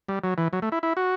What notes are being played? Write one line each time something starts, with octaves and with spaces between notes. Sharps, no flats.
G3
F#3
E3
F#3
A3
E4
E4
F#4